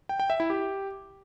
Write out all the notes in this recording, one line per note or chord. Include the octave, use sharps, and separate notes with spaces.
G5
G5
E5
E4
G4